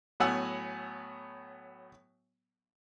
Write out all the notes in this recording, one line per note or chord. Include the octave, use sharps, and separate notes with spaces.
A2 F#3 B3 F#5 G#5 E6